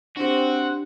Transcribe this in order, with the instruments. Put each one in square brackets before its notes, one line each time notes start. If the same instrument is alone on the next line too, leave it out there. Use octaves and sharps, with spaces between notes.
[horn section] C4 [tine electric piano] D4 G4 [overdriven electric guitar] F#4